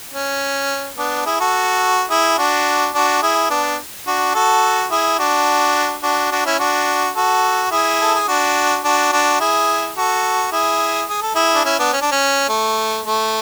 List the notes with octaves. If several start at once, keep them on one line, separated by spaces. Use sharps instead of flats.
C#4
B3 D4
E4 G#4
F#4 A4
E4 G#4
D4 F#4
D4 F#4
E4 G#4
B3 D4
D4 F#4
F#4 A4
E4 G#4
D4 F#4
D4 F#4
D4 F#4
C#4 E4
D4 F#4
F#4 A4
E4 G#4
A4
G#4
D4 F#4
D4 F#4
D4 F#4
E4 G#4
F#4 A4
E4 G#4
G#4
A4
E4 G#4
D4
C#4 E4
B3 D4
C#4
D4
C#4
A3
A3